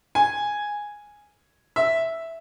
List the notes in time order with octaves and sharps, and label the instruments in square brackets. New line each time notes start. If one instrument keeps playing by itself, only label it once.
[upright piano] G#5
E5